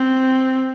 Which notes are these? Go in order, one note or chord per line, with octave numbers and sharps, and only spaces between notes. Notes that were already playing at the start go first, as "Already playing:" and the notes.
Already playing: C4